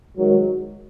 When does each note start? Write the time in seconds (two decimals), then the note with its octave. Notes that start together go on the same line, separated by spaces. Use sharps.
0.17 G#2 D#3 F#3